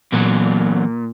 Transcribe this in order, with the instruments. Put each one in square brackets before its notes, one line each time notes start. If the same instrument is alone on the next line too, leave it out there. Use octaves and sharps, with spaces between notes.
[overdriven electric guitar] E2 F#3 [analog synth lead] A#2